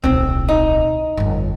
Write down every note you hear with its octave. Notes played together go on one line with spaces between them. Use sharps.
D1 B1 C4
D#4
G1 F2